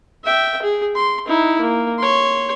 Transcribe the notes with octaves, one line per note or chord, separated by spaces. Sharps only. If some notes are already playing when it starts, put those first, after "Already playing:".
E5 G5
G#4
C6
D#4 E4
A#3
C#5 C6